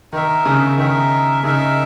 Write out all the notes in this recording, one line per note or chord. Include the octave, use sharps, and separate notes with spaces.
D#3 D#4 A#4 E5
C#3
D#3 D#4 A#4 E5
C#3 D#4 A#4 E5